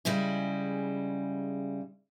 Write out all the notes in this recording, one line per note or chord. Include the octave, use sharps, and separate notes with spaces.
C#3 G3 G#3 E4